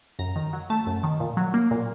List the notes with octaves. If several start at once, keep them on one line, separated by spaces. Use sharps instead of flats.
F#2 A#5
D#3
F#3
A3 A5
F#2
D#3
A#2
F#3
A#3
A#2